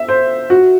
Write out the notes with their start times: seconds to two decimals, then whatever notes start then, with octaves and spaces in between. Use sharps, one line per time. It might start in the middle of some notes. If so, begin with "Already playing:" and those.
Already playing: E5
0.09 C5
0.50 F#4